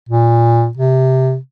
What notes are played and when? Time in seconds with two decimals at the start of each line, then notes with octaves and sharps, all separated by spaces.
0.09 A#2
0.77 C3